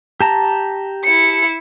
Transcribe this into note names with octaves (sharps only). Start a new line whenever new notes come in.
G4 A5 A#5
E4 C#7